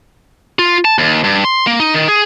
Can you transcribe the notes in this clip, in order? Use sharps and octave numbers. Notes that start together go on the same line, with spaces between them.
F4
A5
D#2
G2
C6
A#3
D#4
D#3
G#4